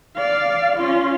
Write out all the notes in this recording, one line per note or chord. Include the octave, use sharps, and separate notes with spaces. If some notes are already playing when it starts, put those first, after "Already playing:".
D5 F5
C#4 F4